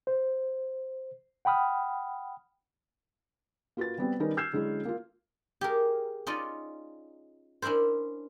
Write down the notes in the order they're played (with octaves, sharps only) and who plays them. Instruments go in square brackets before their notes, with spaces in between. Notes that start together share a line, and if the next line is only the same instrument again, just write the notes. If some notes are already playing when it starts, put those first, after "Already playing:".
[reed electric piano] C5
F#5 G5 B5 D#6 F6
[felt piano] A#3 F4 F#4 B4 A6
G3 B3 C4
D#3 G3 C#4 D#4 A#4 B4
E6 F6 G6 G#6 C7 E7
D3 F#3 G#3 C#4 E4
A#3 F4
[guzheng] G4 G#4 A#4
C#4 D#4 F4 D5 D#5
C#4 D4 E4 A#4 C5